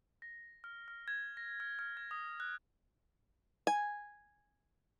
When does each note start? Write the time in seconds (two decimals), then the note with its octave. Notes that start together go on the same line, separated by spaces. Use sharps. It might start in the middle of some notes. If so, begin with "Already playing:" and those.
0.22 A#6
0.64 F6
0.88 F6
1.08 G#6
1.37 A#6
1.60 F6
1.79 F6
1.97 G#6
2.11 D#6
2.40 F#6
3.67 G#5